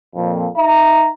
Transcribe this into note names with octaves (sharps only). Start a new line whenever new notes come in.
F2 A#2
D#4 E5 A#5